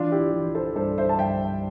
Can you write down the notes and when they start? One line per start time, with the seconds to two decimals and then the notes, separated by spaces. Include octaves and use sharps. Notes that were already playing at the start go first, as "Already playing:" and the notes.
Already playing: E3 D4 F4
0.12 E4 G4
0.33 E3
0.55 A4 C5
0.76 G2 A4 C5
0.98 C5 E5
1.09 A5
1.19 G2 E5 G5